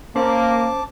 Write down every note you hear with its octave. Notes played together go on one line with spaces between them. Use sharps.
A#3 C#4 C5 A5 D6